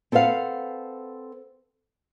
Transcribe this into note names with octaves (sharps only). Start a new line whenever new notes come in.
C4 A4 B4 D#5 F5 F#5